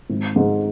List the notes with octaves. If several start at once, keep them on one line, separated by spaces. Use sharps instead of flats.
G#1
G#2